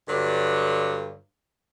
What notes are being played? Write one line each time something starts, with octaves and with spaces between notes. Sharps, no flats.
G2 D3 F#3